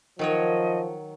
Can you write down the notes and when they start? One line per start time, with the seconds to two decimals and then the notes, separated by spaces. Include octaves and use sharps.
0.19 D#3 F3 F#3 C#5 D#5